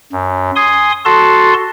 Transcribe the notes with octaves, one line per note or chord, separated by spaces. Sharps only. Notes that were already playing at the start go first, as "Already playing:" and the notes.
F#2
G#5 C6 D#6
F#4 A4 A5 C6